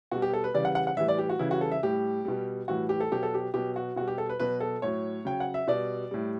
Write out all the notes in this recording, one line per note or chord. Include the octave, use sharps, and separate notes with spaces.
B2 G3 F#4
G4
A4
B4
C#3 E3 G3 D5
F#5
F#5
F#5
A2 E3 G3 E5
D5
G4
F#4
C#3 E3 G3 E4
F#4
A4
E5
A2 G3 G4
B2 G3
A2 E3 G3 F#4
G4
A4
B2 F#3 G4
A4
G4
B2 F#3 G4
F#4
B2 G3 F#4
G4
A4
B4
B2 F#3 B4
A4
A2 F#3 C#5
C#3 F#3 G5
F#5
E5
B2 G3 D5
A2 G3